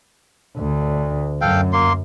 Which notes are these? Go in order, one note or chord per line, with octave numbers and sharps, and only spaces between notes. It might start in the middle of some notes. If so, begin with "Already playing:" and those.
D2
F#2 A4 F5 G5
A#3 C6